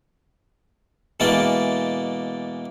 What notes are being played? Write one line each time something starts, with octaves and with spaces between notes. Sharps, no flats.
B2 E3 G#3 A#3 D5 A5